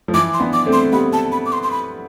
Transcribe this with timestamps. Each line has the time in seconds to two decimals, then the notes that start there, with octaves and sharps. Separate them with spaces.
0.08 F3
0.14 E3 D6
0.34 C6
0.40 B3 D4
0.53 D6
0.66 A3 C4
0.73 C6
0.93 G3 B3 B5
1.13 A5
1.32 B5
1.46 D6
1.52 C6
1.63 C6
1.71 B5